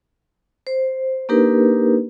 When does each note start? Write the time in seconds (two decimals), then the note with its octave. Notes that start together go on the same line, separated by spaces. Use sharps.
0.67 C5
1.29 A#3 D4 D#4 G4 A#4 B4